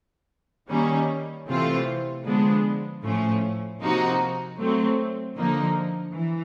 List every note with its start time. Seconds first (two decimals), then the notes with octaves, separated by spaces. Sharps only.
0.70 D#3 G3 A#3 C#4
1.48 C3 E3 A3 C4 F4
2.25 D3 F3 G#3 B3 D4
3.03 A2 F3 A3 C#4
3.81 C3 F3 A#3 D#4 F#4
4.59 F#3 A3 C4
5.37 D3 F3 A#3 D#4
6.14 E3